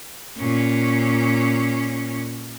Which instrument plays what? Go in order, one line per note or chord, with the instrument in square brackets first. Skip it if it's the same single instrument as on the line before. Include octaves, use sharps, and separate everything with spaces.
[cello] A#2 C#4